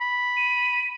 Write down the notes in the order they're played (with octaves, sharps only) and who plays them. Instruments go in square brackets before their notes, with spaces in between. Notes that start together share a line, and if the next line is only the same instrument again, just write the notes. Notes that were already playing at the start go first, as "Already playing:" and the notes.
[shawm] B5
[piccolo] D#7